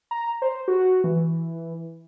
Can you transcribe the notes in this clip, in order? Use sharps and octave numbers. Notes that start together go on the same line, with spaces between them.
A#5
C5
F#4
E3